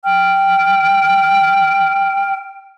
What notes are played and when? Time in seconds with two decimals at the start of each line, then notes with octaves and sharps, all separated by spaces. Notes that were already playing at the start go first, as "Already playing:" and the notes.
0.03 G5 F6